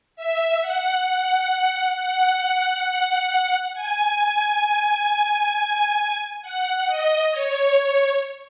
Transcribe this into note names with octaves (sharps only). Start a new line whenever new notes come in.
E5
F#5
F#5
F#5
G#5
F#5
D#5
C#5